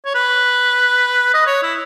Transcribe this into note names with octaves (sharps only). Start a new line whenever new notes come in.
C#5
B4
D#5
C#5
E4